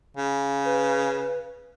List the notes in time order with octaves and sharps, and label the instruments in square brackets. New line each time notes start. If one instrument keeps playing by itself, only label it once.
[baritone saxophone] C#3
[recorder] B4